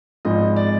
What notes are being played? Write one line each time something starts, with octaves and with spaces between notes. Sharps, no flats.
G#1 G#2 F3 G#3 D#5
D5